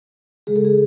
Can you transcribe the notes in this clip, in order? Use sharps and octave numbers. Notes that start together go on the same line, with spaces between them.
C#3 G#3 G#4
A4
G#4